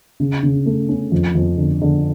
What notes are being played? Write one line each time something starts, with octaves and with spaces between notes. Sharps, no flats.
C#3
C#3
A3
C#4
F2
F2
D3
D3